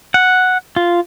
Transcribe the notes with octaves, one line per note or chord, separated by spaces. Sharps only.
F#5
F4